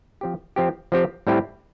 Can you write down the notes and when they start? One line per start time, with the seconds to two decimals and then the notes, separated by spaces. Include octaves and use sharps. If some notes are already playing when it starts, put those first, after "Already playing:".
0.21 F3 C4 G4
0.56 F3 C4 G4
0.92 F3 C4 G4
1.27 A2 G3 C4 E4 G4